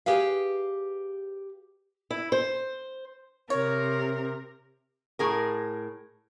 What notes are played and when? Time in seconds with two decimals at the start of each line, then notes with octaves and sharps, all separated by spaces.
0.06 G4 G#4 B4 F5
2.11 E4
2.32 C5
3.50 C3 A#4 C#5
5.19 A2 G#4 A#4